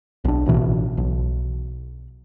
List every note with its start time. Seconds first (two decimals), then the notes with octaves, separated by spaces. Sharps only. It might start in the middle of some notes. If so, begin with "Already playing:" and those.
0.25 B1 D4
0.46 A1 B2 E3
0.97 B1